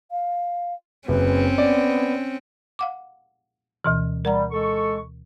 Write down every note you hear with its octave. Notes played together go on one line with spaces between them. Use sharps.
F5
F#1 C4 C#4 B4
B3 D5
F5 F#5 D6
D2 B2 E3
G3 A#4 F#5 A#5
G#3 A4 C#6